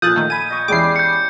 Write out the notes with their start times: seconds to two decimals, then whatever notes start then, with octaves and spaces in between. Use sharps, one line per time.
0.02 A#2 F3 A4 F5 D#6 F#6 G6 A6
0.16 D#3 A3
0.30 G#5 B5 D#7
0.50 D#5 C#6
0.68 E2 G3 G#3 C#4 E4 D6 C7
0.96 G6 C#7